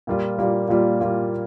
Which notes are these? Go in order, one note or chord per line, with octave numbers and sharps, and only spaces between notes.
A#2 G3 A#3 F4
A#2 G3 A#3 F4
A#2 G3 A#3 F4
A#2 G3 A#3 F4